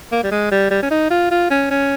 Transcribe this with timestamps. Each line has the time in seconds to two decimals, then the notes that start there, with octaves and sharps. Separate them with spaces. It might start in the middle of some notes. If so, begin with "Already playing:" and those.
0.12 A#3
0.24 G3
0.31 G#3
0.52 G3
0.71 G3
0.83 C#4
0.91 D#4
1.11 F4
1.31 F4
1.51 C#4
1.71 C#4